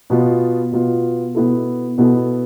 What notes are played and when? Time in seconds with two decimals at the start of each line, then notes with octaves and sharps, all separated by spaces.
0.10 B2 B3 F4
0.72 B2 B3 F4
1.35 B2 B3 E4 A4
1.98 B2 B3 E4 A4